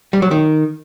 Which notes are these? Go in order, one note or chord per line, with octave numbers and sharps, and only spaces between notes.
G3
F#3
D#3